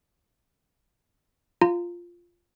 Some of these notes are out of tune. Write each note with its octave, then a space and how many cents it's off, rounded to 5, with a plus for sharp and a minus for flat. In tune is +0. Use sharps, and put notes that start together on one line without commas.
F4 -5 A#5 -25